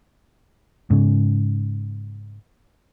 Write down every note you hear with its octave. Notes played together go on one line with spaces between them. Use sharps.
G#2 C#3